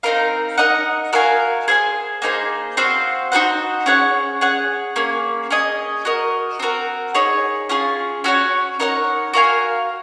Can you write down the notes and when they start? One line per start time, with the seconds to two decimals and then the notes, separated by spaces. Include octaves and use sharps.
0.03 C4 D#4 A#4 F5
0.58 D#4 A#4 D#5 F#5
1.13 F#4 A#4 F5 G#5
1.68 G#4 C5 F5 G#5
2.22 A#3 D#4 G#4 C5
2.77 C4 F#4 C5 F5
3.32 D#4 F#4 C5 F#5
3.86 C#4 G#4 C#5 F#5
4.41 G#4 C#5 F#5
4.96 A#3 C#4 G#4
5.51 C#4 G#4 D#5
6.05 F#4 A#4 D#5
6.60 C4 F#4 A#4
7.15 D#4 G#4 C#5
7.69 C#4 F4 G#4
8.24 C#4 F#4 C#5
8.80 D#4 A#4 C#5 F#5
9.34 F#4 A#4 F5 G#5